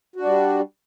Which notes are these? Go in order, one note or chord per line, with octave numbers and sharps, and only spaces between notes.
G3 D4 F#4